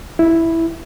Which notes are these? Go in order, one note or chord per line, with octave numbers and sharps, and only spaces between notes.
E4